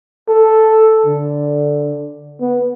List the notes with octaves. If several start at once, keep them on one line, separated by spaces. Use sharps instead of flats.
A4
D3
B3